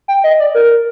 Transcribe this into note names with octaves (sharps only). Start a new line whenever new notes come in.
G5
D#5
D5
A#4